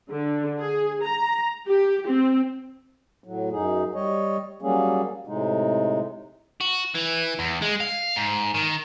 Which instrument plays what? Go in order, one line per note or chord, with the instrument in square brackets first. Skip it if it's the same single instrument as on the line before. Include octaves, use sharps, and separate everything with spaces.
[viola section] D3
G#4
A#5
G4
C4
[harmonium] A2 F#3
F#2 D#4 G#4
G3 C#5 D#5
F#3 G3 A#3 C#4 G#4
A2 C3 G#3 D#4
[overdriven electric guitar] F#4
E3
E2
G#3
F5
G#2
D#3